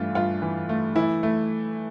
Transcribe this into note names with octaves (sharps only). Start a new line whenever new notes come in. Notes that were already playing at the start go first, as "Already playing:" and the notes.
Already playing: G2 E3 A3 F4
G2 F4
E3
A3
E3 E4
A3